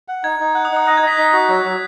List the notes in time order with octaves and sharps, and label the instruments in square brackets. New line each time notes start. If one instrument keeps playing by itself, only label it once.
[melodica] F#5
[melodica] D#4 [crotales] G#6
[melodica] D#4
[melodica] F#5 [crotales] F#6
[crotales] D#6
[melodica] D#4
[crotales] D#6
[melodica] D#5 [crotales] F#6
[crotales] G#6
[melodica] D#5 [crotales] B6
[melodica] D#4 [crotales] B6
[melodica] F#4
F#3
F#3